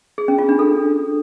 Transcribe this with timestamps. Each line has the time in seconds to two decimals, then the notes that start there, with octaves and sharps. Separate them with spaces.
0.18 G#4
0.28 C#4
0.38 F4
0.49 D4
0.59 A4